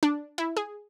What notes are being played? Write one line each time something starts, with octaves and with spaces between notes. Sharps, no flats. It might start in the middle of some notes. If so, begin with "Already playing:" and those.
D4
E4
G#4